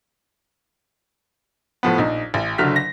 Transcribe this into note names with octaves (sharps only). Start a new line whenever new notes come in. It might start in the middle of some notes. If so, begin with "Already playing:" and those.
A2 F3 B3
A#1 D#4
A1
F#1 D3 F#3 F6 B6
A#6